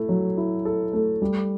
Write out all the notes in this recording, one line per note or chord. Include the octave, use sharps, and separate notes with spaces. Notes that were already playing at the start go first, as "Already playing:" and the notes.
Already playing: A3 E4 A4
F#3
E4
A4
A3
G3